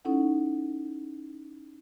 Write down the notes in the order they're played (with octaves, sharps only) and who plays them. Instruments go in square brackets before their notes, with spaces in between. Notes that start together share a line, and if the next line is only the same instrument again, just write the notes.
[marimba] C#4 D#4 E4 A4 F#5